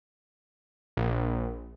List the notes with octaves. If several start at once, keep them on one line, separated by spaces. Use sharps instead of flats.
A#1